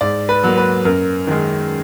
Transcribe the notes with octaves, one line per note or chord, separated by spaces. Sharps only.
G#2 D5
B4
F#3 A#3
B4
F#2 A#4
D#3 G#3